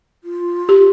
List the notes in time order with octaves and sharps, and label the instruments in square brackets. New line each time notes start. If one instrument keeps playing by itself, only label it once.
[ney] F4
[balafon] G4